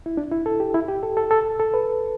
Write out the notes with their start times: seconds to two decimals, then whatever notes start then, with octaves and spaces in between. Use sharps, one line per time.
0.06 E4
0.17 D4
0.31 E4
0.46 A4
0.60 G4
0.74 E4
0.88 G4
1.03 A4
1.17 A4
1.31 A4
1.59 A4
1.74 B4